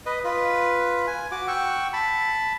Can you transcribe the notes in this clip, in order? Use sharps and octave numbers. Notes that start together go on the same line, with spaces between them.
B4 D#5
F4 B4
G#5
F#4 D6
F#5 G5 C#6 E6
A5 B5